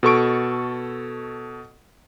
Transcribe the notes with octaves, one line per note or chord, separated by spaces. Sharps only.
B2 A4 C#6 D7